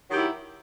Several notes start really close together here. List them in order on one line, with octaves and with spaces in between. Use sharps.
F#3 D#3 G4 E4